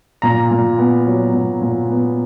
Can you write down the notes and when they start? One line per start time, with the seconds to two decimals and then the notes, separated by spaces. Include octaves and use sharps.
0.22 A#2 A#5
0.51 A#2
0.78 B3
1.06 F#3
1.34 A#2
1.61 A#2
1.89 B3